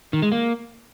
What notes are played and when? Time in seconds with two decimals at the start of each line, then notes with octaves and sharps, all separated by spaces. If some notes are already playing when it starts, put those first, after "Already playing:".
0.13 D#3
0.22 G#3
0.32 A#3